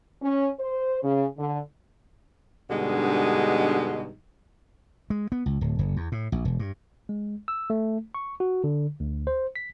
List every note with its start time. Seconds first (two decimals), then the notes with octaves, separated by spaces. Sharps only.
0.22 C#4
0.58 C5
1.03 C#3
1.37 D3
2.70 G2 B2 D3 G#3 D#4
5.10 G#3
5.32 B3
5.46 C#2
5.61 D1
5.79 F#1
5.97 E2
6.12 A2
6.32 A#1
6.45 E1
6.59 G2
7.09 G#3
7.48 E6
7.70 A3
8.15 C#6
8.40 F#4
8.64 D3
9.00 D2
9.27 C5
9.56 B6